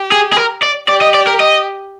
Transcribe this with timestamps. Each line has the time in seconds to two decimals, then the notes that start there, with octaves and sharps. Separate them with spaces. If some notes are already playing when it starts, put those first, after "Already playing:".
Already playing: G4
0.12 G#4
0.32 G#4
0.36 A#4
0.62 D5
0.88 G4 D5
1.01 D#5
1.14 D5
1.27 A#4
1.40 D#5